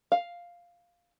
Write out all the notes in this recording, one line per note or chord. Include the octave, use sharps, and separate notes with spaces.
F5